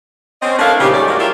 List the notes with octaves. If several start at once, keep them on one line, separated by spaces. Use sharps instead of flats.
C4 C#4 D#5
A3 D4 E4 A#4 C#5 F5
A#2 C#3 F3 D#4 G4
G#2 G3 A3 C#4 G#4 D5
F#3 G#3 A#3 C#4 E4 G4
F4 G4 A#4 D5 E5